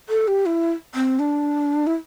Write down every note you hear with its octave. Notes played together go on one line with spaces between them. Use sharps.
A4
G4
E4
C4
D4
E4